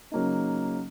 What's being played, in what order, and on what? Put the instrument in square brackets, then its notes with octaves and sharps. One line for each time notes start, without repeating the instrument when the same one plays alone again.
[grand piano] C#3 F#3 A#3 D#4